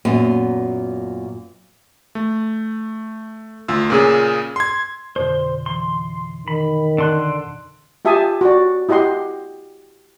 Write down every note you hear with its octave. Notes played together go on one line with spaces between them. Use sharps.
F#2 A#2 B3
A3
D2 F4 E6
A#2 C#3 G#4
C6 G#6
F2 B2 D3 C5
E3 C6
D#3 B5
D3 A5 C6 F#6
F4 G4 E5 G#5 A5 D#6
F#4 D5
E4 G4 D#5 F#5 C6